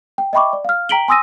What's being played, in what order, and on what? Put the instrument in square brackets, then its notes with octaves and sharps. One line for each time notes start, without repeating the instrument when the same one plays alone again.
[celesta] G5
D#5 E5 G5 B5 C#6 D6
D5
F5 F6
G5 A#5 B6 D7 F#7 G7
G#5 C6 D#6 E6 A#6 D#7